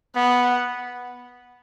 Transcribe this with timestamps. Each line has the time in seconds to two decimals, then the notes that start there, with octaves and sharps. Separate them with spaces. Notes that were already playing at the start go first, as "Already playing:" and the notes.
0.16 B3 F#5